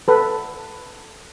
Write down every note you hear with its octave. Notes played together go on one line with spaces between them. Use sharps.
A4 B4